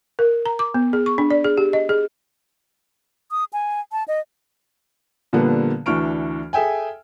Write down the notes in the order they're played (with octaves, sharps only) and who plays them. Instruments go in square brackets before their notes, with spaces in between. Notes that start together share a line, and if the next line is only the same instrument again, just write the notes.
[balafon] A#4
A#5
D6
B3
G#4
C#6
D4
D5
G#4
G4
D#5
G#4
[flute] D#6
G#5
A5
D#5
[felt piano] A#2 D3 F3 G3 A#3 B3
D2 E3 D4 C#6 F6 D7
G#4 A4 E5 G5 G#5